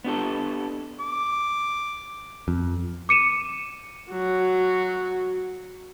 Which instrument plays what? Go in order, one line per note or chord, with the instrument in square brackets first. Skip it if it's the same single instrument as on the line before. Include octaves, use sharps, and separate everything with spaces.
[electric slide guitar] B3 D4 G4 A4
[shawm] D6
[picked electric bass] F2
[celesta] D6 C#7 D#7 E7
[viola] F#3 F#4